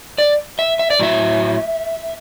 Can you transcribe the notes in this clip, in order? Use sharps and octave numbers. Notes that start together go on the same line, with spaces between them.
D5
E5
E5
D5
A2 F#3 E5